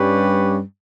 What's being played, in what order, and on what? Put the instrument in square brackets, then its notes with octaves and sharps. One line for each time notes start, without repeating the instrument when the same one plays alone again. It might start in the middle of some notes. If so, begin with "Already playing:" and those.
Already playing: [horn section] G2 G3 C#4 G4 B4